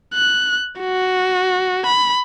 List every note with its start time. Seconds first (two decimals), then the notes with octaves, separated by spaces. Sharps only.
0.15 F#6
0.81 F#4
1.87 B5